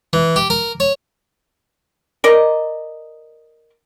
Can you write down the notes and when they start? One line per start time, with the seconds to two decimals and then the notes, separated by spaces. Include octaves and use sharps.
0.13 E3
0.36 G4
0.50 A#4
0.80 C#5
2.24 A#4 D5 D#5